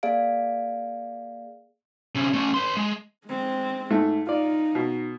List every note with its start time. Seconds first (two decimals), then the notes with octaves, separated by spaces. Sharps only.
0.03 A#3 G#4 D5 F5 D7
2.15 C3 C#4
2.34 A3 C#4
2.54 B4 C6
2.77 G#3
3.26 G#3 C4
3.90 G#2 A3
4.27 D#4 F4 D5
4.75 B2